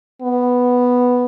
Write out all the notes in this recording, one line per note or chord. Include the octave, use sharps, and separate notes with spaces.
B3